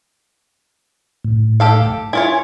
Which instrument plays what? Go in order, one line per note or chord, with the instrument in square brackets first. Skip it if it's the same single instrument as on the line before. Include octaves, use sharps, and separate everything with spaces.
[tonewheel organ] A2
[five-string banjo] G4 A4 F5
[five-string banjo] E4 F4 C#5 [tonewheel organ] G#5